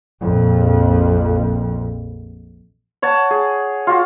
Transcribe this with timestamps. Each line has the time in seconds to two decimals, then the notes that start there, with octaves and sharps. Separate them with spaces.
0.23 A#1 F2
3.02 C#5 F#5 A5
3.30 G#4
3.87 F4 F#4